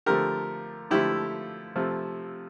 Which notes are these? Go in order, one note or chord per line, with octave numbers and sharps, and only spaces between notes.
D3 F3 A3 G4 A#4
D3 F3 A3 E4 G4
C3 F3 A3